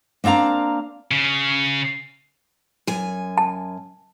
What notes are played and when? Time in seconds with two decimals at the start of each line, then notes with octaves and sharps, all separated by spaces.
0.24 A#3 C4 D4 F5 A#5
1.11 C#3
2.87 F#2 G#5
3.38 A5